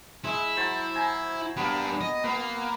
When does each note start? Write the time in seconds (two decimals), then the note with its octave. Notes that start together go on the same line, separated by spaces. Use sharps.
0.24 G#3 E4
0.56 F#3 C5 A5
0.96 G#5 A#5
1.57 G3 A#3 B3 D4
2.01 D#5
2.24 A#3 B3 B4